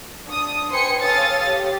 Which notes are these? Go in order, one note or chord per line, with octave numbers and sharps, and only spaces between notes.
D4 D#6
B4 C5 G5 G#5 C6 C#7
A4 C#5 F5 D#6 A6
G4